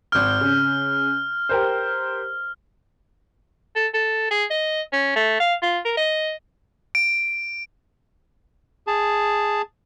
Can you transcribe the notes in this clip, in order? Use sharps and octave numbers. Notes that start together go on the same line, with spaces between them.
G#1 F6 G6
C#3
G4 A#4 C5
A4
A4
G#4
D#5
C#4
A3
F5
F4
A#4
D#5
D7
G#4 A5